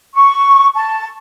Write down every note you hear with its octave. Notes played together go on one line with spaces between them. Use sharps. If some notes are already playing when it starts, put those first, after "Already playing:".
C#6
A5